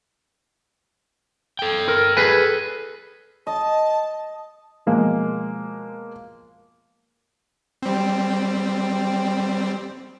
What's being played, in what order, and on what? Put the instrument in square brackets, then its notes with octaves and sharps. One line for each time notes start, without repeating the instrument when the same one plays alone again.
[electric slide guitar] A4 G5
[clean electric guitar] A#4
G#4 B4 G#5
[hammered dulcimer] D#5 [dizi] A5
[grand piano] B2 F3 G#3 A#3
[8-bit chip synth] G3 C4